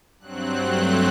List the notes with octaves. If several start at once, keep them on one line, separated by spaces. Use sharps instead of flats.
G2 F#3 C4 F#6
G2 F#3 A3 C4 F#6